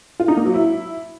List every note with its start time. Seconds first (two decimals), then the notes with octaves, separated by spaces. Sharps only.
0.20 F4
0.28 D#4
0.37 A#3
0.45 F#3
0.54 E4